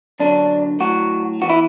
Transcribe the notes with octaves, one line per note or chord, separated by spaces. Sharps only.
F#2 D3 F#3 D4
A2 F#3 F#4
E2 E3 F#4
E4